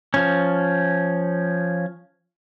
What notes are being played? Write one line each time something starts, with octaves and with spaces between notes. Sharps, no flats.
F3 C#4